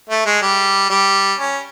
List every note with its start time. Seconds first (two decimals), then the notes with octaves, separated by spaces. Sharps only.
0.09 A3
0.26 G#3
0.42 G3
0.90 G3
1.38 C#4